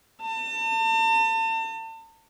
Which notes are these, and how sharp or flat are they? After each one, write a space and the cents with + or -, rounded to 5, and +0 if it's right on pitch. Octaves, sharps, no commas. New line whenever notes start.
A5 +40